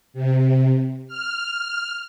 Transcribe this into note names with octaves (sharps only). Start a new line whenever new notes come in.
C3
F6